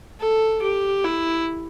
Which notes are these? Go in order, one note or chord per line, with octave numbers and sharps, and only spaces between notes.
A4
G4
E4